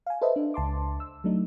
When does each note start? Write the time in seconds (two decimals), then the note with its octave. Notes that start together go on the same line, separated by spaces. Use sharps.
0.06 F5 G#5
0.21 A4 B4 C5 D#5 E5
0.36 D4
0.54 C#2 A5 C6 D6
1.00 E6
1.24 F#3 A3 D4 D#4